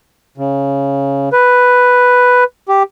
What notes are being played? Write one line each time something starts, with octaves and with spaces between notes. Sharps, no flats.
C#3
B4
G4